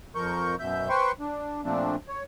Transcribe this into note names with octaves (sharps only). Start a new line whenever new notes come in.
F2 F3 A#4 C#6 G6
F#2 B2 E5 G6
B4 C5 G5 C6 C#6
D4
A#2 F3 A3 C4 D4
C#5